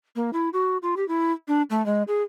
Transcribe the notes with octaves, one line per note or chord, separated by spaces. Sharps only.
A#3
E4
F#4
F4
G4
E4
D4
A3
G#3
G#4